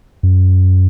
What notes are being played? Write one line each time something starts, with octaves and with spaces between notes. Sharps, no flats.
F#2